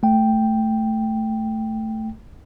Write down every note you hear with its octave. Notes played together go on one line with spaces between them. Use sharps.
A3 G5